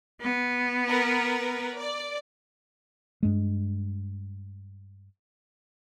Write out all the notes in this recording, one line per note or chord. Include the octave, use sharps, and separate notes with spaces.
B3
A#4 B4
D5
G2 G#3